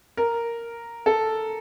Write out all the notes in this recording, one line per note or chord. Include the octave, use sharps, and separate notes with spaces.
A#4
A4